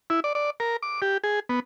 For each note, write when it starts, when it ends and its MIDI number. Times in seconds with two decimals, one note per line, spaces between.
0.10 0.20 64
0.24 0.33 74
0.35 0.50 74
0.60 0.77 70
0.83 1.01 86
1.02 1.18 67
1.24 1.40 68
1.49 1.60 59